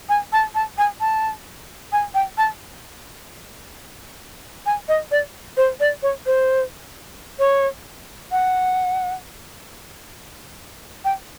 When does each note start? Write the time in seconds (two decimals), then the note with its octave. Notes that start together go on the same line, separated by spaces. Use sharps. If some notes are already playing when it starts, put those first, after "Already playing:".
0.09 G#5
0.33 A5
0.55 A5
0.78 G#5
1.01 A5
1.92 G#5
2.15 G5
2.38 A5
4.66 G#5
4.88 D#5
5.11 D5
5.57 C5
5.80 D5
6.03 C#5
6.26 C5
7.39 C#5
8.32 F#5
11.05 G5